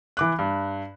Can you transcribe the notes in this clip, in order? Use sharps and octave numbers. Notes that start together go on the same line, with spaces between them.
E3 D6 F#6
G2